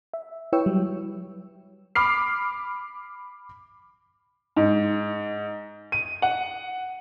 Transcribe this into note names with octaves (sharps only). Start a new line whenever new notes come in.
E5
E4 B4 C#5 G5 C#6 E6
F#3 G3
B5 D6 F6 C7
G#2
D#7
F#5